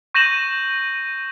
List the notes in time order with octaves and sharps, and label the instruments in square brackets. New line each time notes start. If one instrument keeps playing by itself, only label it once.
[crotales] C#6 G6 A#6 D#7 E7 F#7